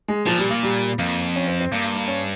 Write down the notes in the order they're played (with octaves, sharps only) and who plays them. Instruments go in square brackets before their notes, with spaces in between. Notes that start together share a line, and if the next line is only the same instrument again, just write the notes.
[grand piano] G#3
[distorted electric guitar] A#2 [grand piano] F3
[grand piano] G3
A#3
G3
[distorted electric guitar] F2 [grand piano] A#3
[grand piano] C#4
C4
C4
[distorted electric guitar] G2 [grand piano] A#3
[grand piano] A#3
A#3
C#4